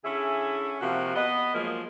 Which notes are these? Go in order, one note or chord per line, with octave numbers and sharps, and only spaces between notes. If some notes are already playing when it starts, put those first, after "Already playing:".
D3 C#4 E4 G#4 E5
C3 F3 A#3 F#4
B3 B4 D#5
F3 F#3 G#3 A#3